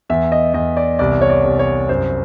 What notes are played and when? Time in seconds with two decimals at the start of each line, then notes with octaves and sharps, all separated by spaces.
0.09 E2 E5
0.32 D#5
0.54 E2 D#5
0.77 D5
0.99 C2 D5
1.21 C#5
1.30 D5
1.44 C2
1.59 C#5
1.89 F#2 C5